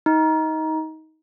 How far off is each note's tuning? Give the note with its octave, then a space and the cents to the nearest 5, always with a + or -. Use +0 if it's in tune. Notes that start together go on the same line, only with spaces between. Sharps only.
D#4 +20